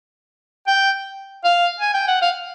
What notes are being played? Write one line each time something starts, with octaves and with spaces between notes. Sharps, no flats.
G5
F5
G#5
G5
F#5
F5